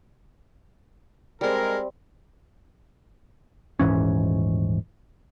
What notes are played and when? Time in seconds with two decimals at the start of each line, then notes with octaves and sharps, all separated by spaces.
1.41 G3 G#3 C4 A#4
3.80 D#1 G#2 E3 C#4